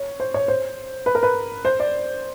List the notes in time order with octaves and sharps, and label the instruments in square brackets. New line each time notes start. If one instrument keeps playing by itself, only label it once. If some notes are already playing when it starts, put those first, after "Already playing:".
Already playing: [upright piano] C#5
C5
C#5
C5
B4
A#4
B4
C5
D5